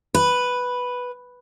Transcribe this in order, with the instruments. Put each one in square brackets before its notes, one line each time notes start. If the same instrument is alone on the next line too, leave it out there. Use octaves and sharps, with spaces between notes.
[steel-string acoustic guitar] B4